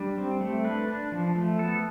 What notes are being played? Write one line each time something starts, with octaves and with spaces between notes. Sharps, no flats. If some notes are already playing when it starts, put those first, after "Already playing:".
Already playing: G3 D4
C4
A3
D4 B4
D4
F3
A3
B3 A4